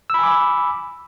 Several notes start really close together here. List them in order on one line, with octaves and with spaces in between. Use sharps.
E6 B5 G#5 D6